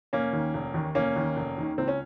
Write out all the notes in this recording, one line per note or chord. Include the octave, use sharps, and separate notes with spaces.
F1 A#3 C#4
D#2 D#3
F1
D#2 D#3
F1 A#3 C#4
D#2 D#3
F1
D#2 D#3
C#2 C4
C#4